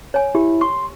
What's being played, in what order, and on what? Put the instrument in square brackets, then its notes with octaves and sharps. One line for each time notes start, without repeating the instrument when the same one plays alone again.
[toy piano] C#5 G#5
[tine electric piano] E4 [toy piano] G4
[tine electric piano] C6 [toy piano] C#6